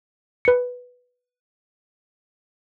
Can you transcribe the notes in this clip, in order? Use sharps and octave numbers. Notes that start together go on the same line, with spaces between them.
B4 C#7